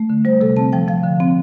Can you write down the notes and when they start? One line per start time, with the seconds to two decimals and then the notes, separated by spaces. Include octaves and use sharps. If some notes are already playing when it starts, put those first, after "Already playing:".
Already playing: A3
0.10 D3
0.25 G3 C5
0.41 C3 A4
0.57 C4 A5
0.72 F3 G5
0.88 F3 F5
1.04 D3
1.20 C4